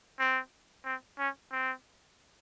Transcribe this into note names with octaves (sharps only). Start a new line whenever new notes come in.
C4
C4
C#4
C4